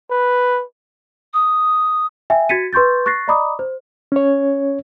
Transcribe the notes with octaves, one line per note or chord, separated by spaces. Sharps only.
B4
D#6
E5 G5 G#5
F#4 G#6 A6 B6 C#7 D#7
B4 C6 C#6 G6 A6
C#6 F#6 A6 A#6 C7
D5 D#5 A#5 B5 D6 D#6
C5
C#4 C#5